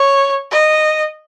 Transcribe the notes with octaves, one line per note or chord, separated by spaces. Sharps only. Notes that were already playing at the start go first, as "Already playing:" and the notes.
Already playing: C#5
D#5